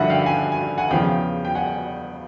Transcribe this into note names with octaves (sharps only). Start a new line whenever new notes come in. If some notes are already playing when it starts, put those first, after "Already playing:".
Already playing: G2 D3 F3 E5 F#5
F5 G5
G#5
G#5
F#5 G#5
E2 C#3 F3 F5 G5
G5
F#5 G#5